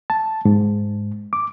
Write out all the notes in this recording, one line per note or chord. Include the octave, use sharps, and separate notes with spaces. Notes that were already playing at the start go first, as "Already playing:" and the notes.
A5
G#2
D6